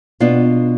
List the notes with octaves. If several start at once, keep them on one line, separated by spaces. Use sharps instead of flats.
B2 B3 D4 F4